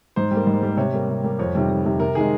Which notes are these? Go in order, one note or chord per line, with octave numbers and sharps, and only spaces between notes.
G#2 C5
G3 A#3
G#2
G3 A#3
C3 C#5
G3 A#3
C3
G3 A#3
F2 C#5
C3 D#3 G3
F2
C3 D#3 G3
C3 A#4
D#3 G#3 G#4